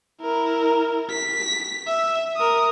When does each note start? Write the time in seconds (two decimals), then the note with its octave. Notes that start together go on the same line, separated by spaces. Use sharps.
0.21 E4 A#4
1.10 B6
1.87 E5
2.37 A#4 D#6